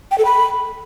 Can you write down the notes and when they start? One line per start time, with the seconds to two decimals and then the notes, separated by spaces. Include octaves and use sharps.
0.11 G5
0.18 A4
0.25 B5